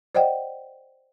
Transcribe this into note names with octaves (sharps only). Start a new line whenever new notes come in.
C5 D5 D#5 F#5 G5